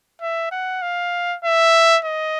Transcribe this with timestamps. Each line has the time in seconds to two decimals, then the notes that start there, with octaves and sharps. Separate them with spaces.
0.22 E5
0.51 F#5
0.82 F5
1.44 E5
2.05 D#5